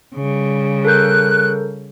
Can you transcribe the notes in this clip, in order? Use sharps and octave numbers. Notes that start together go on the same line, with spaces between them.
C#3 G3
A4 A#4 F#6 G6